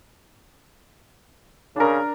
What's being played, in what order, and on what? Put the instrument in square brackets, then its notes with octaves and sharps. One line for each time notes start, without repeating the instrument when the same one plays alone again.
[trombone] C#3 [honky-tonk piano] D4 A#4